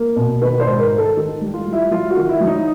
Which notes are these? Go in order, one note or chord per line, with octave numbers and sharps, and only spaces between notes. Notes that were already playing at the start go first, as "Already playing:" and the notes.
Already playing: A#3
B2
D#3 B4
C5
G#2
A#4
D#3
A4
D#3
G3
F4
G3
E4
F#3 F4
F#4
D#3
E4
F#3
D#4